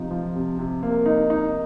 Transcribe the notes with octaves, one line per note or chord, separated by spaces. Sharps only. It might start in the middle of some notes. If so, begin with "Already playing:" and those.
Already playing: C3 F3 D#4
F3
C3
C3
A#3
D#4
D#4